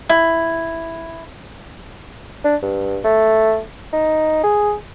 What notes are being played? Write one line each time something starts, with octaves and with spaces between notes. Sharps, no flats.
E4
D4
G2
A3
D#4
G#4